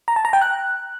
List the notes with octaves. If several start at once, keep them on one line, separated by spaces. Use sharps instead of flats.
A#5
A5
A#5
G5
F#6